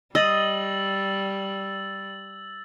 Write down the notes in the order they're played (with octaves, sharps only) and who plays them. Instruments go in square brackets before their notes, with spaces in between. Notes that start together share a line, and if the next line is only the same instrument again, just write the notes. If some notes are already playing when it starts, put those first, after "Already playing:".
[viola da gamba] G3 [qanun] D#5 [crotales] E6 A6 F#7